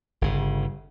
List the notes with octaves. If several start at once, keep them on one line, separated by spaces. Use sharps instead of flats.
G1 C#3